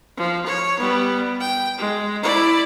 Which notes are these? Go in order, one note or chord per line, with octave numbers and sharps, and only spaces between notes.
F3
C#5
G3 B3
G5
G#3
E4 D5